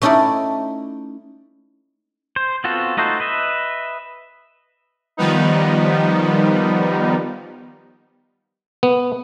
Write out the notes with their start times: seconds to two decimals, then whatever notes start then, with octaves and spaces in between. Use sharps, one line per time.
0.02 A3 C#4 D#4 E4 A4 D5
2.36 C5
2.64 B3 C4 F4 F#4 A4
2.97 A3 D#4 F#4 A4 C5
3.20 B4 D#5 E5
5.17 D#3 F3 G3 B3 D#4
8.83 B3